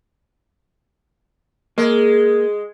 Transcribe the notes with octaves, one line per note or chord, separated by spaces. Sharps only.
G#3 A#3